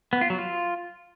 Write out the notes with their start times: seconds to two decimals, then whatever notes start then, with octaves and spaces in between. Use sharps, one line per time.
0.13 B3
0.21 F4
0.30 F#3
0.39 F4